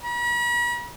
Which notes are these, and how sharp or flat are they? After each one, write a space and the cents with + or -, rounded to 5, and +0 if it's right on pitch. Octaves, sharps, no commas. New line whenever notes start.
B5 -45